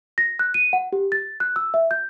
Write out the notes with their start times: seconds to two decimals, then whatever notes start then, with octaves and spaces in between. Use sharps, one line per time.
0.18 A#6
0.39 F#6
0.54 D#7
0.73 F#5
0.93 G4
1.12 A6
1.40 F#6
1.56 E6
1.74 E5
1.91 G6